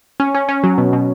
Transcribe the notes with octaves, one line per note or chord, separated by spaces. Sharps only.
C#4
C#4
C#4
F#3
B2
B2